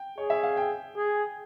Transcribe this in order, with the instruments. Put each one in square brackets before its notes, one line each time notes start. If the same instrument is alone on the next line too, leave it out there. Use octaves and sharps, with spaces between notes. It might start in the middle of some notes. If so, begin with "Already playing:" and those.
Already playing: [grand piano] G5
[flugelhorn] G#4 [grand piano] C#5
[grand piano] E5
F5
G5
[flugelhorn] G#4